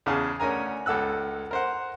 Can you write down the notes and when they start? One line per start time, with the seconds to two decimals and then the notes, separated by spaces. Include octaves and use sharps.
0.06 E2 C#3 G#4 F5 A5
0.40 D2 C#4 A#4 G#5 A#5
0.86 C#2 A4 F#5 E6 F#6
1.51 A#4 C5 F#5